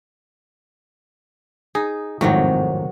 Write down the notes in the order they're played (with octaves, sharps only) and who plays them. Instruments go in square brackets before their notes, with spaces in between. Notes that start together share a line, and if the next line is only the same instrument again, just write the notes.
[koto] D#4 [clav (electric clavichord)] G#4
[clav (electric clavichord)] G#1 F2 A2 [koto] C3 D#3 F#3